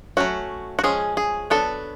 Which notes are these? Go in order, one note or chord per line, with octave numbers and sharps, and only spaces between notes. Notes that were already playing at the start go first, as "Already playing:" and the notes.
F#3 A3 C#4 F#4
F#4
F3 G#3 C#4 G#4
G#4
F#3 B3 D4 A4